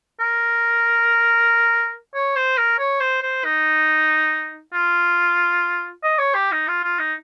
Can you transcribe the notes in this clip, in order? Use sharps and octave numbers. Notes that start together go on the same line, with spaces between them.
A#4
C#5
C5
A#4
C#5
C5
C5
D#4
F4
D#5
C#5
G4
D#4
F4
F4
D#4